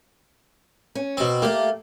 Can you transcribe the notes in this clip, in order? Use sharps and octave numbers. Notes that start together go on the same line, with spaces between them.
C#4
B2 C4
A3 A#3 G4